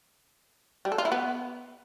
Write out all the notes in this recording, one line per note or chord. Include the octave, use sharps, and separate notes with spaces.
G3
A4
F4
E4
B3